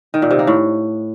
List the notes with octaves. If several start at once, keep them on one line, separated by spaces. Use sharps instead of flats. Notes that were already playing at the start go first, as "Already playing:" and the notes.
D#3
A#2
C3
A#3
A2